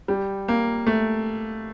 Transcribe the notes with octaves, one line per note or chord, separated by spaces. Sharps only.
G3
A#3
A3